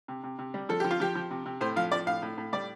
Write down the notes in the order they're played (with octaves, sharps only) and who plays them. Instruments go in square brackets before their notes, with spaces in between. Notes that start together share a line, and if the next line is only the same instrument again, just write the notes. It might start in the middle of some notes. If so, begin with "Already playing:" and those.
[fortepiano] C3
C3
C3
G3
F3 A4
F3 G4
F4
F3 G4
F3
C3
C3
A2 C5
F3 F5
F3 D5
A2 F5
A2
A2
G3 D5